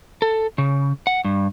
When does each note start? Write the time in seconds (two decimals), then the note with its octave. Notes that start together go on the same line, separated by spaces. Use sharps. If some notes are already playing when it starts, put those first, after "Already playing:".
0.22 A4
0.58 C#3
1.07 F#5
1.25 G2